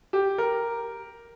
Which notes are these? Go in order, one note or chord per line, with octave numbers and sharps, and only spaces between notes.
G4
A#4